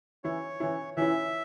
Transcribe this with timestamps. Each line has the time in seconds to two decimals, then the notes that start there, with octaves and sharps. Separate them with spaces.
0.24 E3 C#4 E4 C#5
0.60 E3 C#4 E4
0.97 E3 C#4 E4 E5